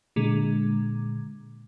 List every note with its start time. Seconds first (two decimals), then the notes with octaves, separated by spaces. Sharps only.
0.16 A#2 D3 G#3